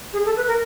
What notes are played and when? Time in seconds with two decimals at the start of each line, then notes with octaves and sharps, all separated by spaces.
0.13 G#4
0.25 A4
0.37 B4
0.47 A#4